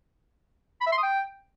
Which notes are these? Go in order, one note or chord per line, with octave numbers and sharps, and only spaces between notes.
B5
E5
C6
D#6
G5